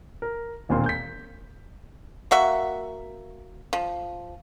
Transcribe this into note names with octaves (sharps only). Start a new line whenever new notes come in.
A#4
E1 D#2 A#2 A#3 C4 C6
G6 B6
A#3 F#4 E5
F3